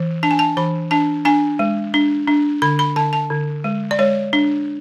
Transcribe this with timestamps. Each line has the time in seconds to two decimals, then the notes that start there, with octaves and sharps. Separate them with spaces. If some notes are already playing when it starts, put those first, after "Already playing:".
Already playing: E3
0.23 D4 A5
0.31 G#5
0.39 A5
0.57 E3 B5
0.91 D4 A5
1.25 D4 G#5
1.59 G#3
1.94 D4
2.28 D4
2.62 D3 B5
2.79 B5
2.96 D3 A5
3.13 A5
3.30 D3
3.64 G#3
3.91 D5
3.99 G#3 C#5
4.33 D4